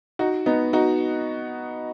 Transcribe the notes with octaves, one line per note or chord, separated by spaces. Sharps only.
D#4 F#4
B3 D#4
D#4 F#4